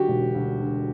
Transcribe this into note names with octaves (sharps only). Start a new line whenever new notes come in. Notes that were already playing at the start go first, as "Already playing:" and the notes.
Already playing: D3 F#3 F#4 G4
E1
D2
D3